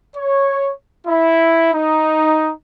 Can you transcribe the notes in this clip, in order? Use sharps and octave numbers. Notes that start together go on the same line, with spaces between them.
C#5
E4
D#4